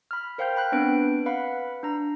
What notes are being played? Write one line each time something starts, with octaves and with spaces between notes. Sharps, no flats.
B5 F6
A#4 C5 F5 G5 F6 G6
G5 B5 F#6
B3 C4 D4 B4 D7
B4 F5 F#5 B5
D4 A#5